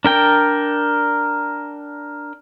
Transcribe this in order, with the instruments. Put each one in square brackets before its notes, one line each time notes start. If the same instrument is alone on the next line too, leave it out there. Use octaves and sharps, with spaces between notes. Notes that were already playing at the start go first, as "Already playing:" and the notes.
[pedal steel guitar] D4 A#4 G5